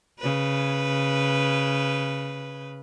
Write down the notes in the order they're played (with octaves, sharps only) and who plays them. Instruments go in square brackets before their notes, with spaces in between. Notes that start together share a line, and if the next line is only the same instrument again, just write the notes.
[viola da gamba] C#3 B4